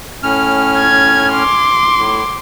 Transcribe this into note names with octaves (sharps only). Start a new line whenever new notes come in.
A2 C#4 F6
G#6
C6 D6
A2